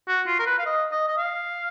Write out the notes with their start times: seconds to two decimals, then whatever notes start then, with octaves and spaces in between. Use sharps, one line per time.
0.08 F#4
0.27 F4
0.39 A#4
0.46 B4
0.59 F5
0.66 D#5
0.91 D#5
1.08 D#5
1.17 F5